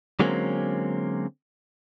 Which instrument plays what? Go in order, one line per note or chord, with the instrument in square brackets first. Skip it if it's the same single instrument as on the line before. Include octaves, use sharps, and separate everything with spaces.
[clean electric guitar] D3 F#3 G#3 A#3 C4 C#4